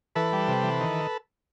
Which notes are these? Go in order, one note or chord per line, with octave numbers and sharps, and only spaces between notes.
E3 A4 B4
G3
C3
E3
D#3